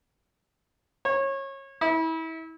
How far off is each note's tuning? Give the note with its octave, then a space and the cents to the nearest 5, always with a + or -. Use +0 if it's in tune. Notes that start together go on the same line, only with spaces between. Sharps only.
C#5 -25
E4 -30